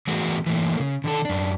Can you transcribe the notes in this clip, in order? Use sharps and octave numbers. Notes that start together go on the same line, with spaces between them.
E3 A3 B3 F#4 G#4 A#4
E3 A3 A#3
C#3
D3 D#3 A4
F#2 D4